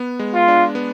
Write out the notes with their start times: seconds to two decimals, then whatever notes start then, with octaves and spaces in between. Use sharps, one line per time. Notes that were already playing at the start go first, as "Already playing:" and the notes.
Already playing: B3
0.19 G#3
0.34 F4
0.48 D4
0.75 B3